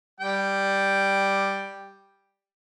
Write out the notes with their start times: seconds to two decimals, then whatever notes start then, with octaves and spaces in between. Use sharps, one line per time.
0.20 G3 G5